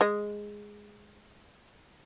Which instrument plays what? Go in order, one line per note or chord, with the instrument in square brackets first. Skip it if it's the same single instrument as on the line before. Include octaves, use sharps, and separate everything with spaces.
[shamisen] G#3 D#5